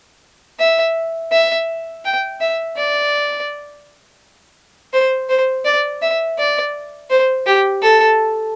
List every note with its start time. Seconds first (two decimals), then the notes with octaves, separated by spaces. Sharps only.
0.60 E5
1.32 E5
2.05 G5
2.41 E5
2.77 D5
4.94 C5
5.29 C5
5.65 D5
6.02 E5
6.39 D5
7.11 C5
7.47 G4
7.83 A4